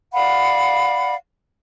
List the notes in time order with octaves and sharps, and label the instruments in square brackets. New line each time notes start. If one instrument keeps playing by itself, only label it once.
[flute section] D5 F5 F#5 B5